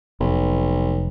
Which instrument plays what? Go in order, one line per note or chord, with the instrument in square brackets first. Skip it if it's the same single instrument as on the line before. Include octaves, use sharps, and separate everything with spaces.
[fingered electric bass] F1 [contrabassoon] B1